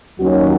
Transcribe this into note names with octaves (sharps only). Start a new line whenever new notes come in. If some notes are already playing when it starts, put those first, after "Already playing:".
D#2 D#3 F#3 C#4 F#4